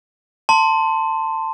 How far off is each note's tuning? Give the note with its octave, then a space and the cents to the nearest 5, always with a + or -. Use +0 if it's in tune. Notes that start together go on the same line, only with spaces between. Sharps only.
A5 +15 C6 +0